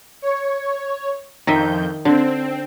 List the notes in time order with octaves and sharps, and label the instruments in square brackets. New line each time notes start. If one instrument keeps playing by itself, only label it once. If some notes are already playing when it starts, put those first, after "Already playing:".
[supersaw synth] C#5
[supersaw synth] F2 G6 [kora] D#3 D#5 E5
[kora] D3 [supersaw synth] C4